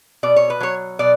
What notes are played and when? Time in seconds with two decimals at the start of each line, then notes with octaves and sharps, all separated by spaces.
0.23 B2 D5
0.36 C#5
0.50 B4
0.61 F#3 C#5
0.99 B2 D5